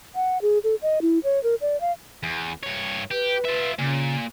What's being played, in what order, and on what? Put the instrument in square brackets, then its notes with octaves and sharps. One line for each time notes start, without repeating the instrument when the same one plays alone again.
[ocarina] F#5
G#4
A4
D#5
E4
C#5
A#4
D5
F5
[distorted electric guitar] E2
G2 C#5
[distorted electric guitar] G4 [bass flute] B4
[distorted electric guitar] F4 E5
[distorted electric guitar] A#2 [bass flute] C#3